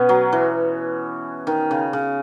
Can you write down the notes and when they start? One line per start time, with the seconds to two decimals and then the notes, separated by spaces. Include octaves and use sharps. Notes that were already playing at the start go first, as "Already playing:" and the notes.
Already playing: B2 B3 C#4
0.09 F#3
0.33 E3
1.47 D#3
1.71 C#3
1.93 C#3